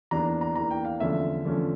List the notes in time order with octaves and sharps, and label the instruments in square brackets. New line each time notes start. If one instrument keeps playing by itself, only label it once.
[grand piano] E2 E3 A#3 D4 A#5
A#5
E2 E3 A#3 D4 A#5
G5
F5
E2 D3 F3 A3 C#4 E5
E2 D3 F3 A3 C#4